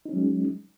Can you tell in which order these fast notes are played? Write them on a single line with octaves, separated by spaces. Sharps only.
D#4 C#4 F#3 G#3